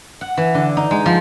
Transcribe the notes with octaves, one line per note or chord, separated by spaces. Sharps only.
F#5
E3
D3
D#4
G#3
F3